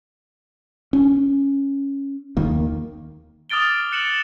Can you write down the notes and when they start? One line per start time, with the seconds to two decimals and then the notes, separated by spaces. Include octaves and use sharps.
0.93 C#4
2.37 D#2 D#3 A#3
3.50 D6 D#6 F6 A6 D7 G7
3.92 F#6 C#7 E7 F#7